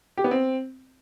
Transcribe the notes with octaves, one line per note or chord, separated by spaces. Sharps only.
G4
B3
C4